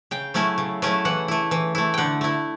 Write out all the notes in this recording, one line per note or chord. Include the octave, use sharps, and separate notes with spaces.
C#3 G5
F#3 A3 C#4 E4
C#3
F#3 A3 C#4 E4
E3 F#5
A3 E4
E3
A3 E4
D3 F#5 G5
A3 E4